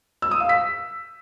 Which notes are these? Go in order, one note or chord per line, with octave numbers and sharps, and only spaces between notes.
E6
D#6
F5
B6